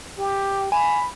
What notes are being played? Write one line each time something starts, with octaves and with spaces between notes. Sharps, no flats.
G4
G#5 B5